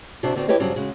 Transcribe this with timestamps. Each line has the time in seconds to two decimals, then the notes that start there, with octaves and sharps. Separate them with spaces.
0.23 C3 D4 F#4 C5
0.36 D3 B3 C4 F#4
0.48 E4 G4 B4 C#5 D#5
0.59 G2 C#3 F#3 G3 C4 D4
0.76 C#3 G#3 F#4